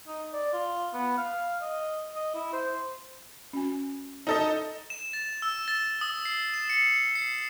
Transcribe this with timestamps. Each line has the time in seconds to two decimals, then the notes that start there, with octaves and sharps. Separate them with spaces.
0.07 D#4
0.33 D5
0.53 F4
0.94 B3
1.18 F5
1.62 D#5
2.15 D#5
2.35 E4
2.53 C5
3.53 C#4 F#4 G#5
4.27 D#4 A4 D#5
4.90 E7
5.13 A6
5.42 E6
5.68 A6
6.01 D#6
6.25 C7
6.54 E7
6.70 C#7
7.15 C7